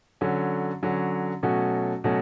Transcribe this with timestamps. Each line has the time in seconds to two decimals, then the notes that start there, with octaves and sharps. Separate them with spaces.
0.21 D3 F#3 C#4
0.83 D3 F#3 C#4
1.43 B2 F#3 A3 C#4 F#4
2.04 B2 F#3 A3 C#4